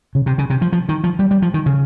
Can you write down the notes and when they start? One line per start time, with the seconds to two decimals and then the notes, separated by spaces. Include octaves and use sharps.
0.15 C#3
0.26 C3
0.38 C#3
0.50 C3
0.62 F3
0.73 F3
0.89 D#3
1.04 F3
1.19 G3
1.31 G3
1.42 F3
1.54 D#3
1.66 C#3